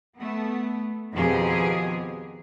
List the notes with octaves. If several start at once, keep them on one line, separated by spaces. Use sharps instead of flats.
A3 B3
F2 B2 D#3 F3 G4 G#4